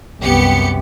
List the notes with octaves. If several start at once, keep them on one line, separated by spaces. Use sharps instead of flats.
C2 F#2 B3 G4 C#7